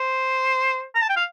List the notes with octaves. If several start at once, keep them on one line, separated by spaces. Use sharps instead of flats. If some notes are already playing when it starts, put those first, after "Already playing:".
Already playing: C5
A#5
A5
G5
F5